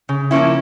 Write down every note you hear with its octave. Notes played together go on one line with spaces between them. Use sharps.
C#3
F3 A#3 C#4 E4